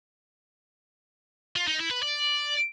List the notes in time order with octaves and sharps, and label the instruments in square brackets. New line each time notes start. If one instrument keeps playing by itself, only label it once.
[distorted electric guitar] F4
D#4
E4
B4
D5